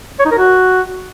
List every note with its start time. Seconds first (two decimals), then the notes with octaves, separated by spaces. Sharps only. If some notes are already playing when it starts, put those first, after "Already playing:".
0.19 C#5
0.25 D#4
0.32 A#4
0.38 F#4